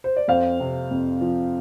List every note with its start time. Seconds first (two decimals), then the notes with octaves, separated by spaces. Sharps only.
0.04 C5
0.16 D5
0.28 F2 C5 F5
0.60 C3
0.91 F2
1.21 F3